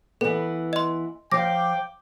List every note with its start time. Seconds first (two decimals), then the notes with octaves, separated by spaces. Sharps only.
0.21 E3 B3 A4
0.73 D#5 C6
1.32 F3 F5 G5 D6 A#6